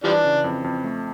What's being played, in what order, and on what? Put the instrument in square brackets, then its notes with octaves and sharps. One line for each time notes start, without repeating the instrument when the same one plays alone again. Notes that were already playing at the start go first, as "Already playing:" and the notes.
[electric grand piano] E3 [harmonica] F3 G3 D4
[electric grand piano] C#3
F2
F2
A3